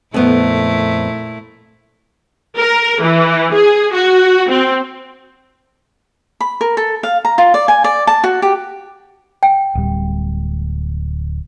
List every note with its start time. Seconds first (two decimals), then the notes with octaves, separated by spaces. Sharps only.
0.14 F2 A#2 A3 B3 E4
2.57 A#4
3.02 E3
3.53 G#4
3.93 F#4
4.50 C4
6.41 B5
6.61 A#4
6.77 A4
7.03 F5
7.25 A#5
7.38 F4
7.54 D5
7.68 G#5
7.84 D5
8.07 A5
8.24 F#4
8.42 G4
9.43 G5
9.75 D1 G3